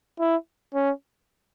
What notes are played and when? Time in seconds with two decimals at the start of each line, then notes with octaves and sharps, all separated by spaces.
0.20 E4
0.74 C#4